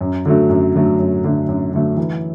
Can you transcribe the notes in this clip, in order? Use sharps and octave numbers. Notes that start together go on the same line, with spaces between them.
F#2
D3 F#3 A3
F#2
D3 F#3 A3
F#2
D3 F#3 A3
F#2
D3 F#3 A3
E3